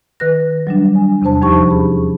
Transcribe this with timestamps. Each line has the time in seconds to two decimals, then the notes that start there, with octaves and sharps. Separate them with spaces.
0.20 D#3 B4 F#6 A#6
0.67 F#3 G3 D4
0.95 G#5
1.22 E2 C3 D4 C5 A5
1.42 D#2 F3 D#4 G4 A5 C#6
1.70 C#4 G#4 B5